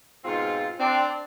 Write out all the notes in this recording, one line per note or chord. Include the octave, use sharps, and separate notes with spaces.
G#2 B2 C4 F4
C4 D4